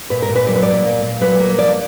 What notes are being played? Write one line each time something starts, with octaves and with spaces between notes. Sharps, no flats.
A#2 B4
A#4
A#2
B4
F#3 D5
B4
A#3 D5
A#2
A#2
F#3 B4
A#3
F3 D5